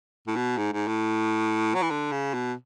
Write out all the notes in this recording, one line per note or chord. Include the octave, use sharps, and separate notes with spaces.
A2
B2
G#2
G#2
A2
F#3
E3
D3
C#3
B2